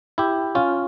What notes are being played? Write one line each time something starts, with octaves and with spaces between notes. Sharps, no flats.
E4 G4
C#4 F4